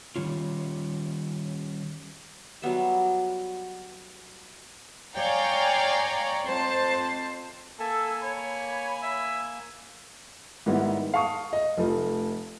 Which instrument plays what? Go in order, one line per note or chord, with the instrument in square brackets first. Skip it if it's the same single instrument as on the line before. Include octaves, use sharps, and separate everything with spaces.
[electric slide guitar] D#3 G3 C#4 F4
[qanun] F#3 G3 B3 E5
[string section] C#5 D5 F5 G5 G#5 A#5
F2 C5 A5
[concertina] A#3 G#5 [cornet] A4 [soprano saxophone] E5
[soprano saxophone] C#5 [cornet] B5
[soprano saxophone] E5
[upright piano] G#2 D#3 G3 A#3 B3 E4
F5 A5 C#6 D#6
D#5
F1 F3 A3